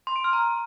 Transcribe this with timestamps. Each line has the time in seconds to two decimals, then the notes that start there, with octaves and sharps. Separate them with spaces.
0.07 C6
0.16 D7
0.24 F6
0.33 A#5